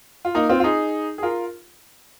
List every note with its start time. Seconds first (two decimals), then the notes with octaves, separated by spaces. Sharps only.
0.25 F4
0.35 A#3 D#4
0.49 C4 F4
0.60 F4
0.64 D#4 G#4
1.18 G#4
1.23 F4 A#4